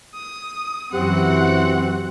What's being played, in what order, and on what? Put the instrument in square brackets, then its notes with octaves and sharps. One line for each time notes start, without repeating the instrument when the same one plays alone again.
[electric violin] D#6
[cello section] F#2 E3 [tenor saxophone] C4 [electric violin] F#4 F#5 [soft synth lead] G4